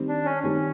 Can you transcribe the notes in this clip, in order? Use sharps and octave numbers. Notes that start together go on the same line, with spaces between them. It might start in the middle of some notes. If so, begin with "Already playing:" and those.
Already playing: D#3 G3 C4
D4
C#4
D#3 G3 C4 C#4